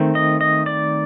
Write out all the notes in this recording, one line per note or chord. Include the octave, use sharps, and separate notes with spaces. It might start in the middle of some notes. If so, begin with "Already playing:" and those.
Already playing: D#3 A3 C4
D#5
D#5
D5